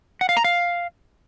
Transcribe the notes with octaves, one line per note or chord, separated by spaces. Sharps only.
F#5
F5
A#5
F5